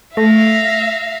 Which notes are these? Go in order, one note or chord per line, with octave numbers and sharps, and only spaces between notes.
A3 E5 F5 A#6